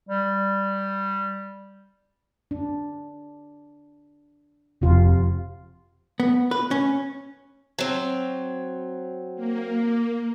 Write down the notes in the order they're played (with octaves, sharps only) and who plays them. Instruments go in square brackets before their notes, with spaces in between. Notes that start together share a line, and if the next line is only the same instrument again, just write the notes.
[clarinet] G3
[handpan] D4
[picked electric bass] F1 F2 [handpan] C3 F4
[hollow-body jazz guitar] B3
B4
C#4
[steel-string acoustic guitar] F#3 C4
[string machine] A#3